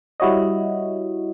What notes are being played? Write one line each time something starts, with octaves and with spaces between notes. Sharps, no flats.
G3 E4 F#4 C#5 D#5